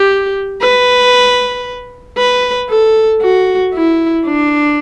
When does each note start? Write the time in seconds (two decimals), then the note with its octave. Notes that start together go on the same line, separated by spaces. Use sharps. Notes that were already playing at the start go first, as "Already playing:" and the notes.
Already playing: G4
0.61 B4
2.18 B4
2.70 A4
3.22 F#4
3.74 E4
4.26 D4